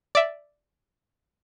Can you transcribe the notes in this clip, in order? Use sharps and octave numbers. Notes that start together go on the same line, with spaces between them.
D5 E5